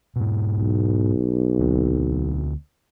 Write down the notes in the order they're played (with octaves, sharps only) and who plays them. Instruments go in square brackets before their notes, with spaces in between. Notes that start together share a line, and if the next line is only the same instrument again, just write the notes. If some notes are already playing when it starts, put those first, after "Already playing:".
[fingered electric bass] G#2 B2
[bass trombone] B1
[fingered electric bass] D2 C4